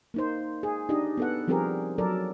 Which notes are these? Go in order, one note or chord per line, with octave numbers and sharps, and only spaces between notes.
A#3 D#4 C5
G#4
D4 D#4 G4 D#5
B3 A4 F#5
F3 G3 C4 G4 G#4 A#4
F#3 A4 A#4 D5